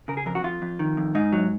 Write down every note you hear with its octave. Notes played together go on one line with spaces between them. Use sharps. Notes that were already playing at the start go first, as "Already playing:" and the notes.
C#3 A#4
G#4
F2 A#4
F#4
F2 F4
F2
D#3
F2
G#2 D#4
F#3